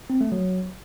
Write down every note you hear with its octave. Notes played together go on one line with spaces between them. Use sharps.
C4
A3
F#3